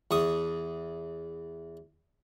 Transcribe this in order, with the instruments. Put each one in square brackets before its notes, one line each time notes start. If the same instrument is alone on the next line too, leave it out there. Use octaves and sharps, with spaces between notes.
[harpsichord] E2 C#6 D#6